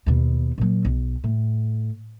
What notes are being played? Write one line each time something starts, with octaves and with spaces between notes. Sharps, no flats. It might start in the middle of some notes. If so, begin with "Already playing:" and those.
D#2 B2
A#2 F#3
B1
A2